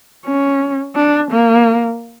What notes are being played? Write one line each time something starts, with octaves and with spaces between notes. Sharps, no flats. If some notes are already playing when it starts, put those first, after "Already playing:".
C#4
D4
A#3